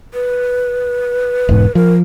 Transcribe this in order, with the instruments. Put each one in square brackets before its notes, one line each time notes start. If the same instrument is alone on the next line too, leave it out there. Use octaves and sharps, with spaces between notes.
[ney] B4
[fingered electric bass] E1 G#2
[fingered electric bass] F3 [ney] A#4